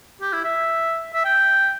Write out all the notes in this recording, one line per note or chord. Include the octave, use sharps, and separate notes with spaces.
G4
E4
E5
E5
G5